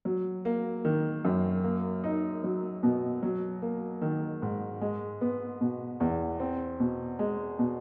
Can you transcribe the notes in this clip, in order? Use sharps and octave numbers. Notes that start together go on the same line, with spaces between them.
F#3
A#3
D#3
F#2
A#3
D#4
F#3
B2
F#3
A#3
D#3
G#2
G#3
B3
B2
E2
C4
B2
G#3
B2